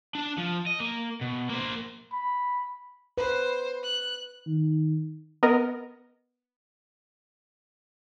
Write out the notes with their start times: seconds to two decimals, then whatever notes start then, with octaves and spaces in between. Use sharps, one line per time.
0.15 D4 A5
0.38 F3
0.66 D#5
0.80 A#3
1.21 B2
1.50 A#3 C5
2.13 B5
3.18 B4 C5
3.83 F#6
4.47 D#3
5.43 B3 A#4 D#5